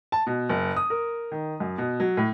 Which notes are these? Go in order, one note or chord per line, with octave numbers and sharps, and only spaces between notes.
A5
B2
F#1
D#6
A#4
D#3
F#2
B2
F#3
A2